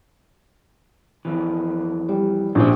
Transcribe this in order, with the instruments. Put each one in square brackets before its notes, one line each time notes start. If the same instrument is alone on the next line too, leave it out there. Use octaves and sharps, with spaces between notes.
[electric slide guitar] F2 E3
[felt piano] G3
[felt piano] A#1 [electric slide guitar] C#4 G4 C5